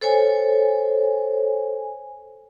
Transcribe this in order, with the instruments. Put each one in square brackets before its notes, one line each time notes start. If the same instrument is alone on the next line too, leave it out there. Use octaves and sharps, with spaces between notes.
[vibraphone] A4 C5 C#5 G#5